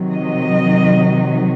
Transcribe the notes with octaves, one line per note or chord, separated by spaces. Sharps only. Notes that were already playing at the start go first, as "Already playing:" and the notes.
Already playing: C3 D#3 F#3
D#5